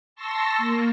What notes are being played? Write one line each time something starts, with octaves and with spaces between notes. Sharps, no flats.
A5 C6 C#6 E6 A#6
A#3